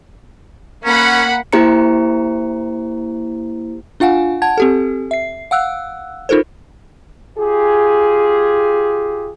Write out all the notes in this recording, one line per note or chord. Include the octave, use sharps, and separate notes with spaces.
A#3 C#4 F#5 B5
A#3 E4 G4 C5 A#5 C#7
D4 F4 F5 F#5 G#5
F#5 A5 G#6
C4 G4 A4
E5 C7
F5 F#5 E6 F#6
D#4 F4 A4 A#4 C5
F4 G4 G#4